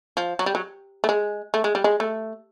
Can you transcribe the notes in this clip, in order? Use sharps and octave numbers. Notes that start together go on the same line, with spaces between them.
F3
F#3
G3
F#3
A3
G#3
A3
G#3
G3
G#3
A3